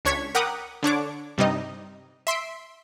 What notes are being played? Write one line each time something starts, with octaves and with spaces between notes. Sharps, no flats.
C#2 D4 C#5 C#6 G#6 B6
A#4 F#5 G5 B5 D6 D#6
D3 D4 C#5 D6
G2 C3 G3 D#4 D#5
E5 C6 B6 D7